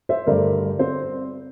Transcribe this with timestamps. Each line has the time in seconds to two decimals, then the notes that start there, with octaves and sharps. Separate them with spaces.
0.09 C5 E5
0.26 G2 D3 A3 A#4 D5
0.79 C4 C5